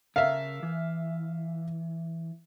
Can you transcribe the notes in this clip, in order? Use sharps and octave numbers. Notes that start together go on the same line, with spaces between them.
C#3 A#4 E5 F5
E3